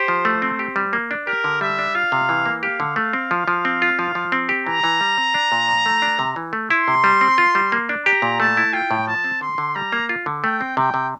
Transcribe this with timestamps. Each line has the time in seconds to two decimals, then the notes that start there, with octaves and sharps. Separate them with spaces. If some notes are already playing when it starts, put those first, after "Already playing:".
Already playing: G4 C5
0.08 F3
0.25 A3
0.42 C4
0.59 G4
0.76 G3
0.93 A#3
1.11 D4
1.27 G4 A#4
1.44 D3
1.61 G3 E5
1.79 D4
1.95 F4 F5
2.12 C3
2.29 E3
2.46 A#3
2.63 G4 F5
2.80 D3
2.96 A3 F5
3.13 C4
3.31 F3
3.48 F3
3.65 C4
3.82 F4
3.99 F3
4.15 F3
4.32 C4
4.49 G4
4.66 E3 A#5
4.84 E3
5.01 G3
5.18 C4
5.34 D4
5.52 A#2
5.68 F3
5.86 A3
6.02 D4
6.19 C3
6.36 E3
6.53 A3
6.70 E4 C6
6.88 C3
7.04 G3
7.21 C4
7.38 F4
7.55 G3
7.72 A#3
7.89 D4
8.06 G4 A#5
8.22 A#2
8.40 A3 A5
8.57 E4
8.73 F4 G5
8.91 A2
9.07 F3 A5
9.24 C4
9.41 D3 C6
9.58 D3
9.75 G3 A#5
9.92 A#3
10.09 F4
10.26 D3
10.44 A3 G5
10.61 C4
10.77 C3 G5
10.94 C3